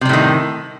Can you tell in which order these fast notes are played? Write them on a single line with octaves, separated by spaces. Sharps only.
C3 G3 A2 D#3